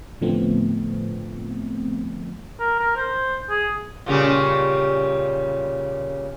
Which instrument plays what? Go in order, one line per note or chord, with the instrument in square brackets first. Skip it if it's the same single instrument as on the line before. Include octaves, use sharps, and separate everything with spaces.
[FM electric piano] A2 D3 F3 A3 B3 C4
[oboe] A#4
A#4
C5
G#4
[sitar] A#2 C#3 G3